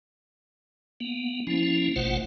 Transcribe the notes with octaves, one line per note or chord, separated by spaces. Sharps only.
A#3 B3
F3 A#3 C#4 E4
G#1 B2 A3 F4 C5 F#5